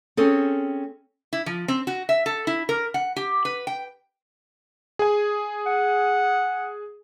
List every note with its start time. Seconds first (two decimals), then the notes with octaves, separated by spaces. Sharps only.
0.17 C4 C#4 G#4 A4
1.33 E4
1.46 F3
1.68 C4
1.87 F#4
2.09 E5
2.26 A4
2.47 E4
2.69 A#4
2.94 F#5
3.16 G4
3.45 B4
3.67 G5
4.99 G#4 G#5
5.66 F#5